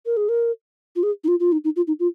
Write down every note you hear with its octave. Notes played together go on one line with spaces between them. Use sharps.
A#4
G#4
A#4
F4
G#4
D#4
F4
F4
D#4
D#4
F4
D#4
F4